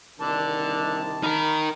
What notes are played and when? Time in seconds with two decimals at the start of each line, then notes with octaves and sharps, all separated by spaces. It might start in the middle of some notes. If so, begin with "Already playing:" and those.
0.20 C2 D3 D#3 D4 A5
1.23 D#4 A#4 B5 F6